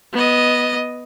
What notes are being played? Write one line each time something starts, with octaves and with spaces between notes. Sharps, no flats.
B3 D#5